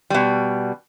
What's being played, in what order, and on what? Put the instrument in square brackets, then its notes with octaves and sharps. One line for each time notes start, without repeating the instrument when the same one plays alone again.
[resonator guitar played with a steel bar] B2 G3